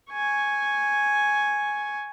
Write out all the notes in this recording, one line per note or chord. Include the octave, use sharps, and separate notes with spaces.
G#5 C#6